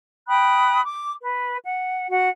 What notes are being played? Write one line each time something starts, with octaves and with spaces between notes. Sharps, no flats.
G5 B5 D#6 F#6
D6
B4
F#5
F#4 F#5